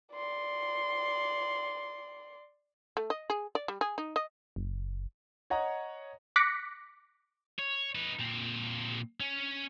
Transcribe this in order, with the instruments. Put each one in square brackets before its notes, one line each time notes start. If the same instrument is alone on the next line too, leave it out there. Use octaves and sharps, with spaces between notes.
[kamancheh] D5 C6
[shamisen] A3
D#5
G#4
D5
G3
G#4
D#4
D#5
[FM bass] F#1
[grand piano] C#5 D#5 F#5 A#5
[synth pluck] D6 F#6 A#6 B6 C#7
[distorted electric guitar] C#5
D#4 B4
A#2 C4
C#4